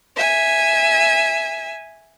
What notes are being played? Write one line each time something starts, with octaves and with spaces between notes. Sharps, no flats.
E5 G#5